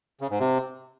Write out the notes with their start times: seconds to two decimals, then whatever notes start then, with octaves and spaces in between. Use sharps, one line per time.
0.21 C#3
0.30 G#2
0.40 C3